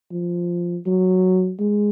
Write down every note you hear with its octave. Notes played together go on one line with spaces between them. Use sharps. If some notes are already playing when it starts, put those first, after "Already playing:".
F3
F#3
G#3